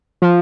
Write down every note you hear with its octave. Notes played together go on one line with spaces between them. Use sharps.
F3